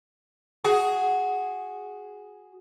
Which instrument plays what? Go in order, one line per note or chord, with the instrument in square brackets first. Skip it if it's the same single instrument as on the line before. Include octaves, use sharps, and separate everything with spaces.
[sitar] F#4 G#4